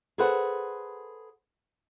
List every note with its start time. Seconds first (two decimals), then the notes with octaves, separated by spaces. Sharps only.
0.18 G#4 A4 B4 C5 F#5